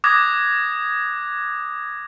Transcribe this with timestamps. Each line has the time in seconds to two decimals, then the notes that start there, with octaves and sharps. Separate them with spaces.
0.04 D6 D#6 F#6 G#6 A#6